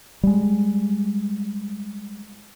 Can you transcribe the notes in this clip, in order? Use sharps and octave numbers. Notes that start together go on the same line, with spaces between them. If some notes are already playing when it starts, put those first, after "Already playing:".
G3 G#3